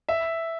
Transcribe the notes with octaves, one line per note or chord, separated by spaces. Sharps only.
E5